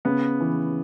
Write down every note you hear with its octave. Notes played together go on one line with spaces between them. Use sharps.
C#3 B3
E3